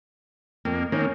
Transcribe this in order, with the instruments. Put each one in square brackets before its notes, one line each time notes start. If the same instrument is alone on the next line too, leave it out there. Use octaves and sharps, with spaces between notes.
[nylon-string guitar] F2 [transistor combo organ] A#3
[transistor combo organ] D#3 A#3 [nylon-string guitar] C#4